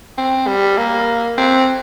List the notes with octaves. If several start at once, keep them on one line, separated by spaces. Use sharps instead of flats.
C4
G3
A#3
C4